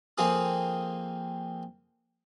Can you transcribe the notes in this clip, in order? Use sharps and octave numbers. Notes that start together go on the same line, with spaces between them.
F2 A#3 C4 G#4 D#6